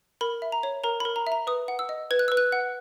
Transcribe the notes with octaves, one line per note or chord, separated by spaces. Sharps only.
A#4 B5
E5
A#5
C#5
A#4 A#5
B5
A#4
A#5
E5
A#5
B4 D#6
F#5
E6
D#5
B4 G#6
F#6
B4 E6
F#6
F#5